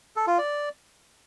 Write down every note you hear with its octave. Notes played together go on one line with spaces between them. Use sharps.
A4
F4
D5